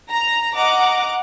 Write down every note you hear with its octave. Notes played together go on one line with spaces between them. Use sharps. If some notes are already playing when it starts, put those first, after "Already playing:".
A#5
D#5 F#5 A#5 D6